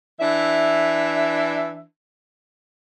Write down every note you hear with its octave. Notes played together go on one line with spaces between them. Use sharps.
E3 D4 E5